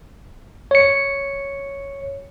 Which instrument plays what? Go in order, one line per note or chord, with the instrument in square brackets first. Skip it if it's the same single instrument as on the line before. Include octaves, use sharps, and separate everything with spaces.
[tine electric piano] C#5 C#7